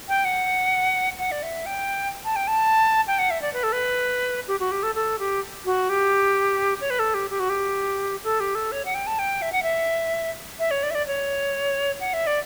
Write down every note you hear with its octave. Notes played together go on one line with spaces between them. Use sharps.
G5
F#5
F#5
D5
E5
G5
A5
G5
A5
G5
F#5
E5
D5
B4
A4
B4
G4
F#4
G4
A4
A4
G4
F#4
G4
C#5
B4
A4
G4
G4
F#4
G4
A4
G4
A4
C#5
F#5
G5
A5
G5
E5
F#5
E5
E5
C#5
D5
E5
D5
C#5
F#5
E5
D5